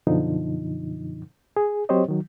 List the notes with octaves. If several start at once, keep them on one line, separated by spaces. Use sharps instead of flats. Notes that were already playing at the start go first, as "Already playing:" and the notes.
F#2 B2 D3 F3 D#4
G#4
F#3 C4 G4 C5 C#5 D#5
D#3 F#3